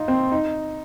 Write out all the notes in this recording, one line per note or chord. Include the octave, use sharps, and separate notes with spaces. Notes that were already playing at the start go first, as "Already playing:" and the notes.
Already playing: D#4 F4
C4
D#4